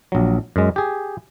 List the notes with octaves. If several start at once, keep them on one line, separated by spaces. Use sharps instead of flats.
A#1 F#3
F#2 G#3
G4 G#4